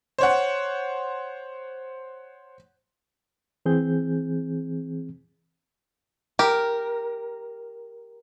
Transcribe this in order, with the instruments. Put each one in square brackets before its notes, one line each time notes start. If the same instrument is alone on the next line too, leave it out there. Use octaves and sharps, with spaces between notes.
[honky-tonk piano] C5 C#5 F#5
[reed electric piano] E3 C4 G#4 G6
[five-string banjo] G4 [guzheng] A#4